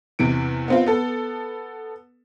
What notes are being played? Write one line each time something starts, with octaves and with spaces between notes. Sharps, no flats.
E2 C3 E3 D7
B3 C4 F4
B3 A4